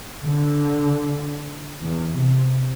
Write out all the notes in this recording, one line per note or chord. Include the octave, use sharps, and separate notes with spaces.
D3
E2
C3